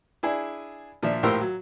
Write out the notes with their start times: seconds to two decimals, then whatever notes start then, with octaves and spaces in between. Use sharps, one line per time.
0.23 D4 E4 G#4 G#5
1.03 A#2 F3 D4 E5
1.23 A#1 A2 G4 A#4 C5 E6
1.41 F#3